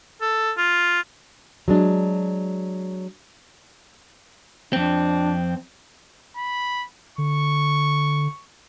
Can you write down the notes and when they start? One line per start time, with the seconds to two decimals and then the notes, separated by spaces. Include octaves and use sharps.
0.21 A4
0.58 F4
1.68 F#3 G#3 D4
4.73 F2 C4 D4
6.37 B5
7.18 D3 C#6